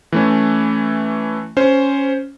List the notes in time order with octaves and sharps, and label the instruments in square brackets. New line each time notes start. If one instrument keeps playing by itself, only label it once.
[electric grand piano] E3 A3 C#4
C#4 C5